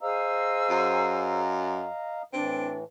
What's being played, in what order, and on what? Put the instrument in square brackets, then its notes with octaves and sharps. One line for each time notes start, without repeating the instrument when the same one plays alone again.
[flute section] G#4 C5 E6 [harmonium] D#5 F5 A#5
[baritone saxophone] F#2
[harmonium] A2 E3 [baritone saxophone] C4 [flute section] D4